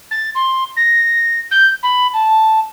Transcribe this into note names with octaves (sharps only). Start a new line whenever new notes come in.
A6
C6
A#6
G6
B5
A5